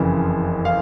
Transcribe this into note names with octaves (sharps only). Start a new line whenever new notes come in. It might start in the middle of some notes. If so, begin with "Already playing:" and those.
Already playing: F#1 F2 C#3 E3
F5